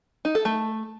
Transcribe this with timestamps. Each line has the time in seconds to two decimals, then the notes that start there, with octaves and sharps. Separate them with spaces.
0.25 D#4
0.35 A4
0.45 A3